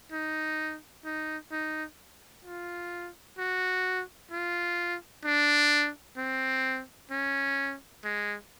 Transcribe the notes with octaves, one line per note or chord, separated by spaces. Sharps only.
D#4
D#4
D#4
F4
F#4
F4
D4
C4
C#4
G#3